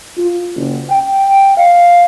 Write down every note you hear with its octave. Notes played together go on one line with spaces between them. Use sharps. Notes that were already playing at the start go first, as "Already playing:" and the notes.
F4
F#1
G5
F5